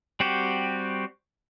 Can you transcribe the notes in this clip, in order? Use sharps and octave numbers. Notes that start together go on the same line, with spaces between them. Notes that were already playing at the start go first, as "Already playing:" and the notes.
G3 C4 F#4 G4